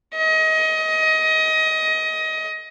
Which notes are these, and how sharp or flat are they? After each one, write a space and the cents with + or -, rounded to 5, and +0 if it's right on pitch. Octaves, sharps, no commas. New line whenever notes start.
D#5 +25